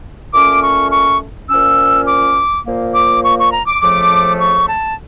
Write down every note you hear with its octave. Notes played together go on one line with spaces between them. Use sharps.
A#2 A3 C#4 D6
C#6
C#6
A#2 F3 C#4 E6
D6
A#2 F3 A#3
D6
C#6
C#6
A#5
D6
F2 C#3 F3 A3 D6
C#6
A5